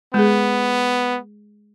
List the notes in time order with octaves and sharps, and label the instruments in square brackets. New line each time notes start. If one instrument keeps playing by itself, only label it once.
[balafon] G#3 G#4 [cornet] B3